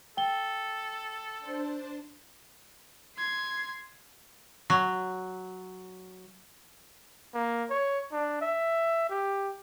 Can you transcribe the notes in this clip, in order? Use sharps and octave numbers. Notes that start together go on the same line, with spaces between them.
A4 G5 G7
D4 C5 A5
C6 G#6
F#3
A#3
C#5
D4
E5
G4